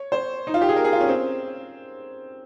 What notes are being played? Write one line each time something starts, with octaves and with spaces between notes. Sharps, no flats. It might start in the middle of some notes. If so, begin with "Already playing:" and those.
Already playing: C#5
C5
D#4
F4
G4
G#4
A#4
G#4
F4
C#4
C4